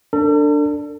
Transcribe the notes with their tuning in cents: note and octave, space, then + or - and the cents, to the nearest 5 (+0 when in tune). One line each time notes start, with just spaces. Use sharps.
D4 +0 A4 +40